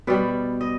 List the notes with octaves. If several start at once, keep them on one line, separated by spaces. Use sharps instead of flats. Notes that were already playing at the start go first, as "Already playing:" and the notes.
B2 G3 B4 D5
D#5